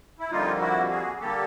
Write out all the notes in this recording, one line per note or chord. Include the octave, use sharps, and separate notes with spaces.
E4
F2 D3 G3 A#3 D#4 F4
E4 F#4
F#4 G#4
D3 G3 A#3 G4 A4